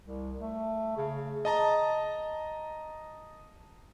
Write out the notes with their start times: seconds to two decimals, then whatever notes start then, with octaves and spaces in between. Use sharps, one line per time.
0.03 C2
0.39 A3
0.97 C#3
1.45 D#5 A5 A#5